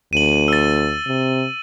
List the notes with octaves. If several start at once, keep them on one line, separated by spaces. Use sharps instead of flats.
D2 D#7 F#7
E6 A6
C3